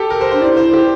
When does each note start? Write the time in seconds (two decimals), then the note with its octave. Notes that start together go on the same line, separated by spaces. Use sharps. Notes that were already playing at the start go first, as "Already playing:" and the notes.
Already playing: G4 A4
0.10 A#4
0.21 C5
0.31 D4 C5
0.41 E4 D5
0.57 C5
0.74 G4